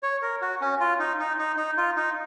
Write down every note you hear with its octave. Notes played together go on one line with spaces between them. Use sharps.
C#5
A#4
F#4
C#4
F4
D#4
D#4
D#4
D#4
F4
D#4